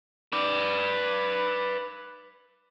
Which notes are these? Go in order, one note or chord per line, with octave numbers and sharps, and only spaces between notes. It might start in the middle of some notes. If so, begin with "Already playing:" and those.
B4 D5